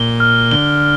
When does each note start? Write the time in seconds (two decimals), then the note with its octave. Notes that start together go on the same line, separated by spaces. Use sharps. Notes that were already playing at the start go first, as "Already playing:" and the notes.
Already playing: A#2 G7
0.20 F6
0.51 D3 G7